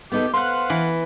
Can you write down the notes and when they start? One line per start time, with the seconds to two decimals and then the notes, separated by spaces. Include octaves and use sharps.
0.12 B3 D#4 G4 A4
0.34 B4 C5 F5 F#5 C6 F#6
0.70 E3